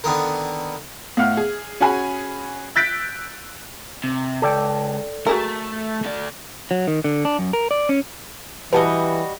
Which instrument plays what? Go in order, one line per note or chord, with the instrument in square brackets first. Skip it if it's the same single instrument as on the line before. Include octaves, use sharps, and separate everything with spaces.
[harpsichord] D3 D#3 B3 A#4
[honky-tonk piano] A2 F5 F#5 F6
G#4
C#4 F#4 G#4 G#5 B5
E6 F#6 G6 A6 B6 D7
[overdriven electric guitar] C3
[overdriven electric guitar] C#2 [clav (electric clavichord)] A4 D5 G5
[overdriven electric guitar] A3 [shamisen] F#4 G#4 A#4
[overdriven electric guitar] A3 D5
[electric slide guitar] F#3
D#3
D3
D4
F#2
A#4
D5
C#4
[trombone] E3 [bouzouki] G3 F#4 D#5 [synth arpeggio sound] B4 A5